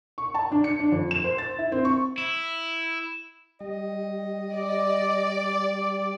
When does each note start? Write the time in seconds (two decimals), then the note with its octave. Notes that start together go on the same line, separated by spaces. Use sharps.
0.18 C#6
0.34 A5
0.51 D4
0.64 C#7
0.80 D4
0.92 F2
1.11 E7
1.24 C5
1.38 A6
1.58 E4
1.72 C4
1.85 C#6
2.18 E4
3.61 G3 D#5
4.53 D5